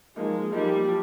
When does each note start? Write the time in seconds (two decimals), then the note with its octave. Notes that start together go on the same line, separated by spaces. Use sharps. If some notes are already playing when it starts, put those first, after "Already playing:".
0.16 F3 G#3 A#3 D#4
0.52 F3 G3 A#3 D#4
0.88 F3